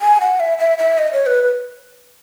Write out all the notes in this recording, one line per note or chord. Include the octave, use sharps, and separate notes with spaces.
G#5
F#5
E5
E5
E5
D#5
C#5
B4
B4